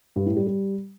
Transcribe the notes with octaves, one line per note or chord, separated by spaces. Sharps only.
G2
A2
G3
G3